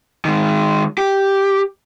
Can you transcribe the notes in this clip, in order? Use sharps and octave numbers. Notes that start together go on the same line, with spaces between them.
D#3 G#3
G4